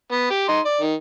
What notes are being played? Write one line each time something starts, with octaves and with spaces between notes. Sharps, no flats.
B3
G4
D#4 C6
D5
D#3